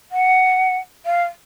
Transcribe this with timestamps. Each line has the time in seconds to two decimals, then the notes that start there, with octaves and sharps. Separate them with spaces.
0.12 F#5
1.05 F5